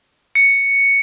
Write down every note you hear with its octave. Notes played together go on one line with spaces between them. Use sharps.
C#7